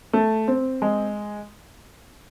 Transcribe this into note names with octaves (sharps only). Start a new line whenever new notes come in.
A3
C4
G#3